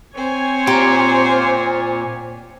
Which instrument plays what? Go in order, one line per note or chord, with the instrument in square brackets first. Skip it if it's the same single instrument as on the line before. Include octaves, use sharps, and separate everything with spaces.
[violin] C4 C5 [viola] C#5 G#5
[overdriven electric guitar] A#2 [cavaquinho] G4 A#5 C6